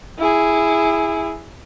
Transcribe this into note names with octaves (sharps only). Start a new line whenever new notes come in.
E4 G#4